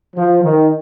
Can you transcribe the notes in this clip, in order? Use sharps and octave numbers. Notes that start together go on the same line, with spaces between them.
F3
D#3